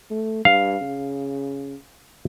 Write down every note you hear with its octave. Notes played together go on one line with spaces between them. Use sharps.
A3
G2 F5
C#3